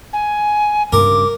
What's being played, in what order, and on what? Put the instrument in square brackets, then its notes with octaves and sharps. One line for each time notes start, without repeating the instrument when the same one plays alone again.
[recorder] G#5
[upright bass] G2 C#3 [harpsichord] A#4 [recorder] D6